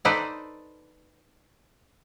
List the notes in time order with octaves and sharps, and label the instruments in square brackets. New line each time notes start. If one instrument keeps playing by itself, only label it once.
[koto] D#4 A4 B4 C5 D5